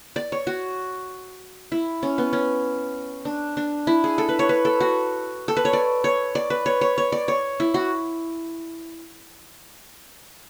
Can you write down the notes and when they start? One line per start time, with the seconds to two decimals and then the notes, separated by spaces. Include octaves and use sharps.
0.16 D5
0.32 C#5
0.47 F#4
1.72 E4
2.03 C#4
2.18 B3
2.33 C#4
3.25 D4
3.57 D4
3.87 E4
4.04 G#4
4.18 A4
4.29 B4
4.39 C#5
4.49 B4
4.65 A4
4.80 F#4
5.48 A4
5.57 B4
5.65 C#5
5.73 D5
6.04 C#5
6.35 D5
6.50 B4
6.66 C#5
6.81 C#5
6.98 C#5
7.12 D5
7.28 C#5
7.60 E4
7.74 F#4